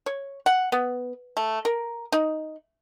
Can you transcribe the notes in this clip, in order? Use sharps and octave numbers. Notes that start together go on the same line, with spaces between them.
C#5
F#5
B3
A3
A#4
D#4